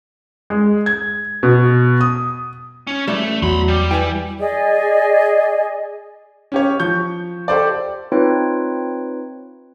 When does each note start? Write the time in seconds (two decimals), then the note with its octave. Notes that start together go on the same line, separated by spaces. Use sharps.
0.50 G#3
0.86 G#6
1.43 B2
2.01 D#6
2.87 C#4
3.08 A1 E3 G3 A3
3.42 E2 F#3 B5 C6
3.68 G3
3.91 E3 G5 G#5
4.39 G#4 D5 D#5 G#5
6.52 C#4 G4 C#5
6.80 F3 C#6 G6
7.48 G4 A4 C5 D5
8.12 C4 D#4 F4 B4 C#5 G5